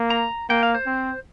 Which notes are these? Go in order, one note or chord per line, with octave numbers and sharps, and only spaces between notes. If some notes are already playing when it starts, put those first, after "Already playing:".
Already playing: A#3
A#5
A#3 G5
F5
C5
C4